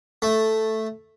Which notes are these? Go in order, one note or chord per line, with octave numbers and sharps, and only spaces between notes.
A3